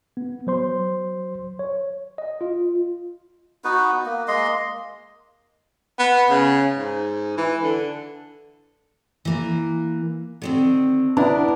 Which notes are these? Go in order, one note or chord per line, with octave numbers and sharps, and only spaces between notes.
B3
F#3 C5 C6
C#5
D#5
F4
B3 D#4 F#4 B4
A#3
G#3 A#3 D#5 C6
B3
C#3
G#2
E3
D3
E3 A#3
D3 D#3 C4
B3 D4 E4 A#4